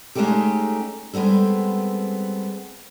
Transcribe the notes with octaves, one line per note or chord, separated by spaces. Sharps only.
G#3 A3 C#4 D#4 G4 A4
G3 G#3 B3 C4 A4